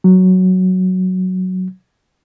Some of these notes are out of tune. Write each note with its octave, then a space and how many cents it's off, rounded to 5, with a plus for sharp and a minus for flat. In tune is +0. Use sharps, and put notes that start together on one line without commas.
F#3 +0